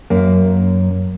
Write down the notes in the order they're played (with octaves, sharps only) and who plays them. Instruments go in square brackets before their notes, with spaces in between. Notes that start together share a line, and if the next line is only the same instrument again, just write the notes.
[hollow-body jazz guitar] F#2 A#3